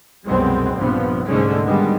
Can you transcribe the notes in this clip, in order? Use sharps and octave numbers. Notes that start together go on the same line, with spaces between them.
C2 F#2 B2 G#3 B3 C4
A#1 G2 C3 F3 B3
C2 G#2 D3 G#3 A3 C#4
G2 D#3 G3 G#3 B3